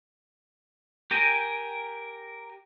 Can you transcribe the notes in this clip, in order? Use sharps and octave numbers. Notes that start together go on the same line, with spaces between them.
G4 A#4 G5 G#5